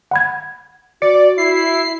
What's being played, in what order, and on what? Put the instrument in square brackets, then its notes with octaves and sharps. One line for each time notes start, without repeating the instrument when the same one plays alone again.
[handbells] F#5 B5 G#6
[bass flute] F#4 [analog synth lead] D5 [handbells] C#7
[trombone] E4 [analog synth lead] C7